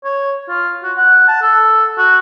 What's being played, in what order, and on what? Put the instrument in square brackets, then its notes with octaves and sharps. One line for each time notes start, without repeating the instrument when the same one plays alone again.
[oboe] C#5
F4
F#4
F#5
A5
A4
F#4